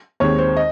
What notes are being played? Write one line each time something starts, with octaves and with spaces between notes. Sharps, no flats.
D#2 D#3 G#3 C4 C#5
C5
D#5